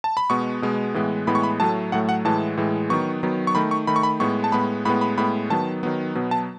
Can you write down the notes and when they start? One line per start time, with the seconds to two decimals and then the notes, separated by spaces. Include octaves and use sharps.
0.04 A5
0.17 B5
0.30 B2 G#3 B3 C#6
0.62 B2 G#3 B3
0.94 A2 E3 G#3 B3
1.27 A2 E3 G#3 B3 B5
1.35 C#6
1.43 B5
1.60 A2 F#3 A3 A5
1.92 A2 F#3 A3 F#5
2.09 F#5
2.25 A2 E3 G#3 A5
2.57 A2 E3 G#3
2.90 D#3 F#3 B3 C#6
3.23 D#3 F#3 B3
3.47 C#6
3.55 D#3 A3 B5
3.71 C#6
3.87 D#3 A3 B5
3.96 C#6
4.03 B5
4.20 A2 G#3 B3 C#6
4.44 A5
4.52 A2 G#3 B3 B5
4.85 A2 G#3 B3 B5
5.01 B5
5.18 A2 G#3 B3 B5
5.50 D#3 F#3 B3 A5
5.83 D#3 F#3 B3
6.15 B2 F#3 B3
6.31 A5